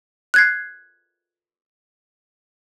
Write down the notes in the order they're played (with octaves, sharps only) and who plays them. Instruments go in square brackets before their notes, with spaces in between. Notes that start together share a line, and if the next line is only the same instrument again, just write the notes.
[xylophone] F#6 G#6 C7